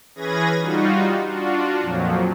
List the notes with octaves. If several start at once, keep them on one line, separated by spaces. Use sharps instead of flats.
E3 C#4 G#4 B4 G#6 A#6
G3 D#4 F4 F#4
D4 F4 F#4
F2 A#2 F3 F#3